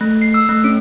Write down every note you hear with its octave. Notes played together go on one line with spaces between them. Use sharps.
A3
C7
E6
A3
C#4